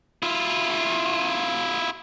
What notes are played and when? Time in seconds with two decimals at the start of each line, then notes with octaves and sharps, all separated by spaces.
0.23 E4 F4